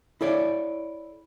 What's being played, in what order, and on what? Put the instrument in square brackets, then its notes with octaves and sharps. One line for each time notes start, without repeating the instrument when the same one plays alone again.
[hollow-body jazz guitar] E4 A4 C#5 D5